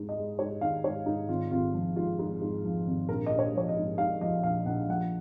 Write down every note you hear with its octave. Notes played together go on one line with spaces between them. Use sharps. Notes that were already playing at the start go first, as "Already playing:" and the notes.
Already playing: G#2 G#3
D#5
G#3
G#2 C#5
D#3 F5
G#2 C#5
G#2 D#4
G#1 F4
G#1 F4
F3
G#2 F4
G#2
G#2
F3
G#1
A#1 A#4
A#1 D#5
C#5
F3 C#5
D#5
G#2
G#2 F5
F3 D#5
A#1 F5
A#1 F#5
F3 F#5